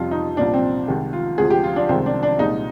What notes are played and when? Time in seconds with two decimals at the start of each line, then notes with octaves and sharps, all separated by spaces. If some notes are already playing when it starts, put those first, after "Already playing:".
Already playing: F2 C3 G3 F4
0.11 D#4
0.37 C2 A#2 F3 D4
0.54 C4
0.88 C2 C3 D#3 G#3
1.13 F4
1.38 D2 C3 F3 G#3 G#4
1.50 G4
1.64 F4
1.76 D4
1.89 C2 C3 D#3 G#3 C4
2.06 D4
2.23 D4
2.39 C2 A#2 F3 G#3 D#4